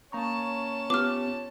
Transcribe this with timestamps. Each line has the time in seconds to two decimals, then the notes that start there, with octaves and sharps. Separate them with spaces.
0.12 A#3 C#4 A5 A#5 C#6
0.90 B3 F4 G4 D6 F6